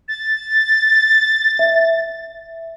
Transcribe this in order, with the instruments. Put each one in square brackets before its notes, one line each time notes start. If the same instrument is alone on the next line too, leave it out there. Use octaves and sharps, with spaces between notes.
[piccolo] A6
[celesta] E5